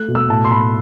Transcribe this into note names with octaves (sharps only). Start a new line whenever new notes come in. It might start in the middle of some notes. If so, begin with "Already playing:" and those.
Already playing: A3 F#6
B2
E6
A2 A5
C6
A2 B5